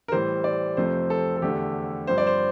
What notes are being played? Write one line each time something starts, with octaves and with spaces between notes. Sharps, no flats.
A#4
A2 E3 G3 C5
D5
F2 C3 F3 A3 C4 C5
A4
A4
E2 D3 A3 G4
G2 F3 C4 C5
D5
C5